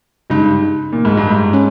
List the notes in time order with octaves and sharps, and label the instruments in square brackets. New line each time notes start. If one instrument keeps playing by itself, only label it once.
[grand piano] G2 [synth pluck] C#3 G#3 D#4
[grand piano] A#2
G#2
G2
G#2
[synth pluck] C#4